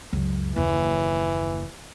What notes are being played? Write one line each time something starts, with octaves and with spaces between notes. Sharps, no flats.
C#2 F#2
F#1 D#2 E3